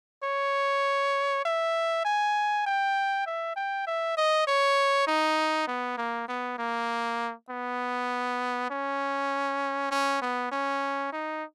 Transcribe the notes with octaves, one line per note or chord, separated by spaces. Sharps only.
C#5
E5
G#5
G5
E5
G5
E5
D#5
C#5
D#4
B3
A#3
B3
A#3
B3
C#4
C#4
B3
C#4
D#4